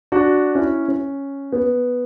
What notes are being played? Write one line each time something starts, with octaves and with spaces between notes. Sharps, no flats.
D4 F#4
C#4 E4
C#4
B3